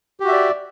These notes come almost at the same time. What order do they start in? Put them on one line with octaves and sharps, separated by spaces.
G4 F#4 E5 D5